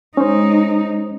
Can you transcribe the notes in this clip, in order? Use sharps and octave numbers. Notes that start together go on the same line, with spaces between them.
G#3 C#4 D#4 C5